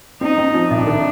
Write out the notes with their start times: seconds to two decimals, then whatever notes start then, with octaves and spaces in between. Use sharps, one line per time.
0.21 C4 D#4
0.38 C4
0.54 F3
0.71 C2 D4
0.87 D#3